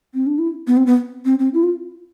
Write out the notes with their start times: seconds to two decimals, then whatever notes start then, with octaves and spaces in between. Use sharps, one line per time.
0.14 C4
0.27 D4
0.39 E4
0.67 B3
0.77 C4
0.86 B3
1.25 C4
1.39 C4
1.54 E4
1.63 F4